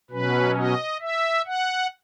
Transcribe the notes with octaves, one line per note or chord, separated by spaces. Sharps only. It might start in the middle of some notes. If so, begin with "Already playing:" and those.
B2 F#3 C#4 B4
D#5
E5
F#5